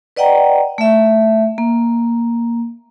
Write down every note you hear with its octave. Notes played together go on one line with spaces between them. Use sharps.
B4 D5 D#5 F#5 G5 A#5
A3 E5
A#3